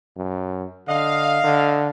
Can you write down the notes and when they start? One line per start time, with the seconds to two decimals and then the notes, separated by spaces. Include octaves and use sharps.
0.17 F#2
0.88 D3 D#5 F5
1.44 D3